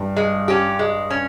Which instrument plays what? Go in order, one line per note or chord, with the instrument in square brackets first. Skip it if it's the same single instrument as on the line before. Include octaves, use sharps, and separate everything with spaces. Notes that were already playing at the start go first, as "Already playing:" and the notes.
Already playing: [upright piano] G2
[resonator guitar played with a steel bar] G#3
C#4 G4
G#3
C#4